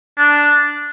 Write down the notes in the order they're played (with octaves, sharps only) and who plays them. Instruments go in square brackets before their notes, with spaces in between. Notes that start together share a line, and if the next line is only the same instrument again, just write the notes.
[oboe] D4